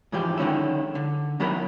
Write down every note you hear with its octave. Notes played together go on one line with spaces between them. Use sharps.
G#2 E3 F3 G4
D3 D#3 C#4 E4
D3
D#3 F#3 B3 E4 A#4 B5